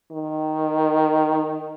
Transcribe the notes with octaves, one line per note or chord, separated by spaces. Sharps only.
D#3